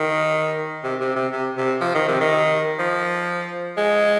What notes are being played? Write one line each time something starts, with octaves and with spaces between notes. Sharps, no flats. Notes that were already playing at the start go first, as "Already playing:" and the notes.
Already playing: D#3
C3
C3
C3
C3
C3
F3
D#3
C3
D#3
F3
G#3